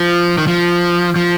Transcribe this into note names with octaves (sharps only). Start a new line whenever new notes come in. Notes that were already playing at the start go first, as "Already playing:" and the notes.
Already playing: F3
D#3
F3
F3